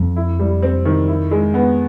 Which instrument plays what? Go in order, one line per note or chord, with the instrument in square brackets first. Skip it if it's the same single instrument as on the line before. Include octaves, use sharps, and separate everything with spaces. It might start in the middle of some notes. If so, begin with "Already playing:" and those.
Already playing: [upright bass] F2
[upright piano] E4
G3
C4
D#3
E4
G#3
B3